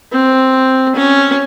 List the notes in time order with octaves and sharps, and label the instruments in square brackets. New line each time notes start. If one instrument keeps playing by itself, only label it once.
[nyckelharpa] C4
C#4